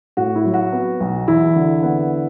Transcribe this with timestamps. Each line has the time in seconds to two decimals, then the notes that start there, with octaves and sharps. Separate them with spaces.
0.17 A2 F#4
0.35 E4
0.45 F#3
0.54 F#4
0.72 B3
1.00 B1
1.28 E2 E4
1.56 D3
1.83 B3